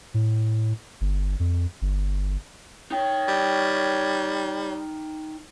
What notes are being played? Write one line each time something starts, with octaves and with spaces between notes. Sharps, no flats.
A2
G1
F2
G1
D#4 C#5 G5
G3